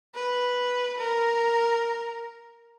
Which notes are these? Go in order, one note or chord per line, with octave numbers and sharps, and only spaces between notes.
B4
A#4